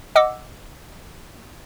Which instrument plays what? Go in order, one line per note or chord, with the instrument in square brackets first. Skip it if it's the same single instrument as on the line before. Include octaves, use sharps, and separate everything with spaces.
[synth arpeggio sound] D#5 F#5 D6 E6